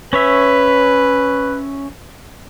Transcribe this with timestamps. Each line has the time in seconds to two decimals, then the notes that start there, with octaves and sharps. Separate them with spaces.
0.13 C#4 B4 C#5 E5